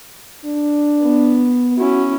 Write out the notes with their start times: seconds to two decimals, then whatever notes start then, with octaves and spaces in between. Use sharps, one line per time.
0.45 D4
1.01 B3
1.78 C#4 E4 F#4